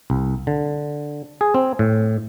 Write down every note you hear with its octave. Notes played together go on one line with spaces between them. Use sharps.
C2
D3
G#4
C4
A2